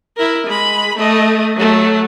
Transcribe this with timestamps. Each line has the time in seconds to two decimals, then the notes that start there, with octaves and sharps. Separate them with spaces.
0.17 E4 A#4
0.47 G#3 B5
0.97 A3 D#5
1.56 F#3 A3